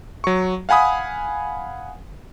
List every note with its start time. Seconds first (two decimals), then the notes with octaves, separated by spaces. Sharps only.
0.24 F#3 C#6
0.69 F5 F#5 G#5 B5 D#6